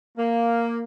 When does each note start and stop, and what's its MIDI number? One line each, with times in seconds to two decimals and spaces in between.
0.17 0.81 58